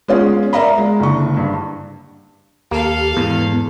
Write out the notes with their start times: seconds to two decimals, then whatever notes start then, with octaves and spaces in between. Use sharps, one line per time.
0.08 G#3 B3 C#4 F4 G#4
0.53 A#4 D5 E5 F5 A#5 B5
0.78 G#3
1.00 F#1 D3 C#6
1.37 G2
2.71 D#2 A#3 G4 A4 F5
3.17 E2 G#2 E3 B3